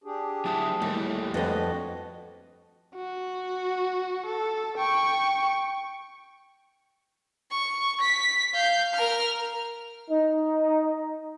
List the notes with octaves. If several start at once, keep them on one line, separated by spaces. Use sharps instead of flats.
D4 G4 G#4
F#3 E4 A5 D#6
D#2 A2 G3 A3
F2 D4 F#4 B4 D#5
F#4
A4
G5 C#6
C#6
B6
F5 G6
A#4 F6
D#4